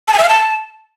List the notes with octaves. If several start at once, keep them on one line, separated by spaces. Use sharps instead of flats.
A5
G#5
E5
F5
A5